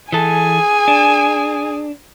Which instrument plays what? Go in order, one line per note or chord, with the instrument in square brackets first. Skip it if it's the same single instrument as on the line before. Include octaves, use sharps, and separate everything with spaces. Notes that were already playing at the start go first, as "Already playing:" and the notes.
[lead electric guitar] E3 A4 [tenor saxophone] G#4 [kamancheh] G#5
[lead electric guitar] D4